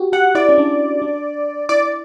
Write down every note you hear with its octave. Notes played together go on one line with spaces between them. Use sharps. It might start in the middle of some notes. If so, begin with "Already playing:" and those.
Already playing: F#4 G4
G4 F#5
E4 D5
C#4
D4
D4
E4 D5